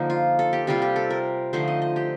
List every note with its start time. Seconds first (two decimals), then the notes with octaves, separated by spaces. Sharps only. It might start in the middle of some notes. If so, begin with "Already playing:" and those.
Already playing: D3 F3 A#3 D#4
0.10 F4
0.39 A4
0.53 G4
0.67 C3 G3 C4 F4 G4
0.82 G4
0.96 A4
1.10 A#4
1.53 D3 F3 A3 D#4 C5
1.68 D#5
1.82 D#5
1.96 G4